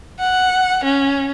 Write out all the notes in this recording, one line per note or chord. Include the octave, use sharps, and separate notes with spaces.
F#5
C#4